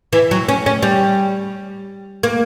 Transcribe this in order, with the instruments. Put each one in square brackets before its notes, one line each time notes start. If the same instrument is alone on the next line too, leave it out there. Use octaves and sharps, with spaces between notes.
[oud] E3
F#3
C#4
C#4
G3
A#3